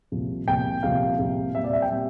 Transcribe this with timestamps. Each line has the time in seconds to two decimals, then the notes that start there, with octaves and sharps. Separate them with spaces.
0.12 C2 A#2 F3
0.47 C2 A#2 F3 G5
0.83 C2 A#2 F3 F5
1.19 C2 A#2 F3
1.55 A#2 G3 C4 E5
1.64 D5
1.73 E5
1.82 G5
1.91 A#2 G3 C4